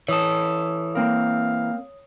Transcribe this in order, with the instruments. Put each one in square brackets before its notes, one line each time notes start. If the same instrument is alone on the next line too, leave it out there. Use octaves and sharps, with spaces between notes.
[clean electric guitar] E3 A4 [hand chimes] C#5 D#6
[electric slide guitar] A#3 C4 A#4 [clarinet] F5